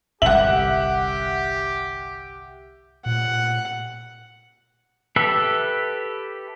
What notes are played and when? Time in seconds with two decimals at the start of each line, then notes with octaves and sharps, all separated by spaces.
0.22 G1 C2 G4 E5 F#5 F#7
3.06 A#2 F#5
5.16 G4 A4 B4 E5